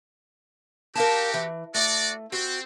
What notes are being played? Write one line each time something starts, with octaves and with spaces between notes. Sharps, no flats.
C4 F#4 G4 A#4 F5 A5
E3
A3 F#4 D5
C4 F#4